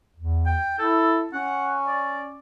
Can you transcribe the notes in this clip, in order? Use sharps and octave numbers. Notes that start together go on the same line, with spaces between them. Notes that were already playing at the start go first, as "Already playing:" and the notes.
E2
G5
E4 A4
C#4 F#5
D5